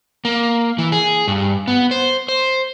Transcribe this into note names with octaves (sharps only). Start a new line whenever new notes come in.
A#3
E3
G#4
G2
B3
C5
C5